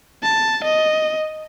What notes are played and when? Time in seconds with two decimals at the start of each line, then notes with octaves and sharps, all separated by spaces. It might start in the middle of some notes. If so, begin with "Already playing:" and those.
0.23 A5
0.64 D#5